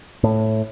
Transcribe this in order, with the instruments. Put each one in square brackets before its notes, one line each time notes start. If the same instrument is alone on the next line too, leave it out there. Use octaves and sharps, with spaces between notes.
[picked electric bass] A2